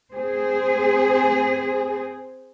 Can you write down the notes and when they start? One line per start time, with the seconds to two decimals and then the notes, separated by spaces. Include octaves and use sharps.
0.13 C4 G#4 C5